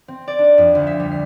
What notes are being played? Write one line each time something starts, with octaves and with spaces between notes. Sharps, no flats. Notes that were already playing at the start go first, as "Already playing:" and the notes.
C4
D5
D4
F2
D2
E5
G3
C7